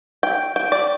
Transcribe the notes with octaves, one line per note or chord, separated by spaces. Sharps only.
G5
G5
D5